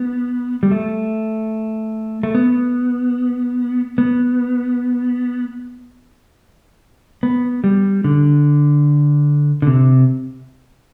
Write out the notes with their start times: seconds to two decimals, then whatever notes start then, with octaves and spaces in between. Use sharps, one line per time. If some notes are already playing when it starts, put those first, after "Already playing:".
Already playing: B3
0.63 G3
0.71 A3
2.23 A3
2.35 B3
3.98 B3
7.23 B3
7.64 G3
8.04 D3
9.62 D3
9.67 C3